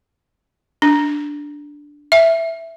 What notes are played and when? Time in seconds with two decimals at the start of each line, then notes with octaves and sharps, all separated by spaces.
0.82 D4
2.12 E5